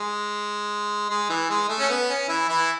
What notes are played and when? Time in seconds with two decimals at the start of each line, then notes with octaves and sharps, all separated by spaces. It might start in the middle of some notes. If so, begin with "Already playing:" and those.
Already playing: G#3
1.10 G#3
1.29 E3
1.50 G#3
1.69 A3
1.79 C#4
1.90 B3
2.10 C#4
2.28 E3 E4
2.48 E3 E4